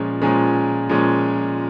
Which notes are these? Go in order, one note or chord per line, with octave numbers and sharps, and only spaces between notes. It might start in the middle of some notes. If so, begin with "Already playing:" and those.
Already playing: A#2 F3 G#3 C#4
A#2 F3 G#3 C#4
A#2 F3 G#3 C#4